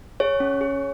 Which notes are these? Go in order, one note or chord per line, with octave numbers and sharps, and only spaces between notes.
G#4 C#5
C#4
G#4